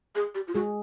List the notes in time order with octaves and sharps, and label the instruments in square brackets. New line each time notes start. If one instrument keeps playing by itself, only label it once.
[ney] G#4
G4
F4
[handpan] G#3 G#4 [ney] F#4